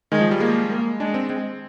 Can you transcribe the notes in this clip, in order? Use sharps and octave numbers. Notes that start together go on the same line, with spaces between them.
D#3 G#3
F3
G3
G#3 A#3
A#3
G#3 D4
C4
G#3 C4